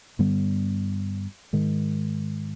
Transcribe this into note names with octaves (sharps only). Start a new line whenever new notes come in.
G2 D3 G3 B3
G#2 D#3 G#3